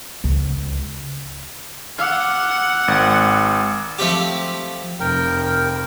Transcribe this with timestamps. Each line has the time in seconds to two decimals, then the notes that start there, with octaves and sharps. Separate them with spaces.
0.24 C#2
1.98 F#5 D6 E6 F6
2.88 G#1
3.99 F3 A3 C4 G4
5.00 F1 A#4 G5